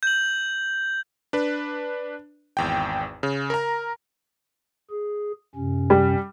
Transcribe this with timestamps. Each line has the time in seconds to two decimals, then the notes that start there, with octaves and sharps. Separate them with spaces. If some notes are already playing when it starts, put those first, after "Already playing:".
0.03 G6 F#7
1.33 D4 B4
2.57 G#1 E2 G5
3.23 C#3
3.50 A#4 A#5
4.90 G#4
5.55 F#2 C3 C#4
5.90 G3